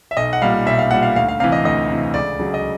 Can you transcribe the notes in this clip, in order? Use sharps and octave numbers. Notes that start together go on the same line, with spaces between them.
E5
B1 D#5
F#5
A#2 G3 F5
B1 E5
F5
A#2 G3 F#5
F5
D2 F5
F5
C3 E3 F5
D#5
D2 D#5
C3 E3
C#2 D5
C#3 F#3
D#5